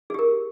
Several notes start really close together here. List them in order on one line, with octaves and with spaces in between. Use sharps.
G#4 G4 A#4